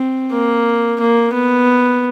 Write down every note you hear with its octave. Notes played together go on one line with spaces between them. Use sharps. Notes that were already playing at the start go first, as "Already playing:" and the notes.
Already playing: C4
A#3
A#3
B3